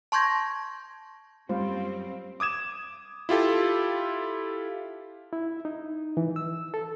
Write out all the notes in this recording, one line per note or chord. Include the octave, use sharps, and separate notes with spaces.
A5 C6 C#6 G6 G#6 A#6
F#2 G3 C4 C#4 F4 C5
D6 D#6 G#6 E7
E4 F4 G4 A4
E4
D#4
E3
E6
A4